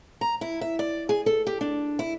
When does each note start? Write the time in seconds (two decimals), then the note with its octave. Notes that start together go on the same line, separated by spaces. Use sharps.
0.21 A#5
0.41 E4
0.61 E5
0.79 D5
1.09 G#4
1.26 A4
1.47 G4
1.61 D4
1.99 E4